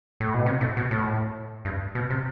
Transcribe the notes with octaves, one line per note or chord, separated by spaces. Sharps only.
A2
B2
C3
A2
B2
A2
G2
B2
C3